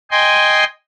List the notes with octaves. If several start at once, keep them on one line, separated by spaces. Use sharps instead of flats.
D#5 G5 G#5 C6